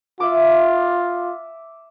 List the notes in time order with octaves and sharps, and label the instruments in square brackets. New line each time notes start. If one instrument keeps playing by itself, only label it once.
[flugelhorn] F4 [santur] E5 D6